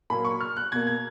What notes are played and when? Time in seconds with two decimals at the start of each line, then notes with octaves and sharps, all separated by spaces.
0.10 A#2 F#3 A#3 B5
0.25 C#6
0.41 F6
0.56 F#6
0.72 B2 A#3 G#6
0.87 G#6